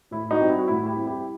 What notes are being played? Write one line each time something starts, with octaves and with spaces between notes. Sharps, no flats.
A2 E4
D#4 F#4
G3 C4
E4
F#4
A2 E4
E4 G4
G3 C4
E4 G4